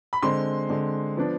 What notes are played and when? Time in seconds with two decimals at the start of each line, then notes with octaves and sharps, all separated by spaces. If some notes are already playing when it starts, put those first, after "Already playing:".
0.13 B5
0.23 D3 G#3 C4 C6
0.70 D3 G#3 C4
1.17 F3 B3 D4